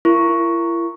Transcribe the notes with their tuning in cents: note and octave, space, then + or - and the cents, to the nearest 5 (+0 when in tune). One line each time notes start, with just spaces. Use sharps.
E4 +40 A#4 +0 C#6 +0